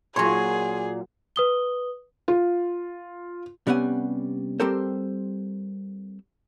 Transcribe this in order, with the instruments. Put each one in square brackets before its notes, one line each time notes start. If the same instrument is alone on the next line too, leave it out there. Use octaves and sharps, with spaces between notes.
[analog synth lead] A#2 [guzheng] F#3 C#5 [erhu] G#4 [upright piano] C6
[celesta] B4 D#6 G7
[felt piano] F4
[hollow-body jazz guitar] C3 G3 B3 C#4 F#5 G#5
G3 C4 G4 A4 A#4 C5